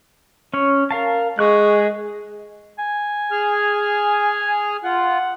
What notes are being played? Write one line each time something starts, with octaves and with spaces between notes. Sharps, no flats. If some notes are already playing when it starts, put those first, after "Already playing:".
C#4 C#5
A#4 F5 A5
G#3 G#4 C#6 F#6
G#5
G#4 F6
F4 F#5